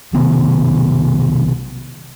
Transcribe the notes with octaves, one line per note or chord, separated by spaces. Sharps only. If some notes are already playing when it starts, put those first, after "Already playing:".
B1 C3 D#3 B3